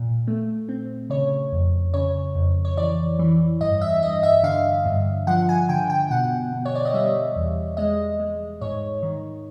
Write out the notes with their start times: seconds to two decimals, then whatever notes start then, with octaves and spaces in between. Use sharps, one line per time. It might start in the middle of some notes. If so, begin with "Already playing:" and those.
Already playing: A#2
0.27 A3
0.69 C4
1.10 C#3 C#5
1.52 F2
1.94 C#3 C#5
2.35 F2
2.65 C#5
2.77 E3 D5
3.19 E3
3.61 G2 D#5
3.81 E5
4.02 G2 D#5
4.23 E5
4.43 D3 F5
4.86 G2
5.27 F3 F#5
5.49 G#5
5.69 D3 G5
5.90 G5
6.10 B2 F#5
6.52 B2
6.65 C#5
6.75 D5
6.85 D#5
6.94 G3 E5
7.36 E2
7.77 G#3 D#5
8.20 G#3
8.61 G#2 C#5
9.03 D#3